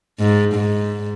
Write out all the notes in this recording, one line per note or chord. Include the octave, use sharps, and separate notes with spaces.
G#2
G#2